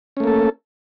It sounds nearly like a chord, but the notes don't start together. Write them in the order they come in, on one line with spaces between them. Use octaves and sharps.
C#4 A3 A#3 A4